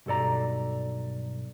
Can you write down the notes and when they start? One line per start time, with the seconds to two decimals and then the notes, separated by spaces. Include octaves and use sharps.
0.06 B1 G2 A4 D5 A#5